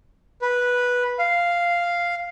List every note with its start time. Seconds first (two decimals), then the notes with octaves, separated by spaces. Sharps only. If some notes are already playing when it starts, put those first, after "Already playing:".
0.42 B4
1.19 F5